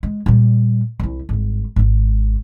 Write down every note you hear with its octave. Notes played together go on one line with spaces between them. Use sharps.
G#3
A#2 G3
C2 E4
G#1 G2
G#1 G#2